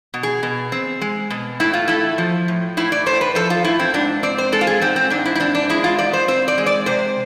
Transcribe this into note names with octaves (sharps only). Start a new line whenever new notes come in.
B2
G#4
B2
C4
G#3
B2
A2 E4
F4
A3 E4
F3
A2
A2 E4
D5
A3 C5
B4
F3 A4
F4
A2 E4
C4
G#2 D4
C4 D5
C5
G#3 A4
F4
G#4
G#2 C4
C4
G#2 D4
E4
E4
C4 D4
D4
G#3 E4
F4
G#2 D5
C5
C4 C5
D5
G#3
D5
C3 C5